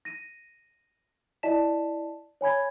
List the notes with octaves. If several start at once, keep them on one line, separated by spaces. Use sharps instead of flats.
A#6 D#7
E4 D5 D#5 A5 B6 E7
C#5 G#5 B5 G#6